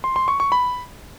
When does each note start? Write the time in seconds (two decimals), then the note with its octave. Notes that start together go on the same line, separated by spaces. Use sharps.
0.04 C6
0.16 C6
0.28 C#6
0.40 C#6
0.52 B5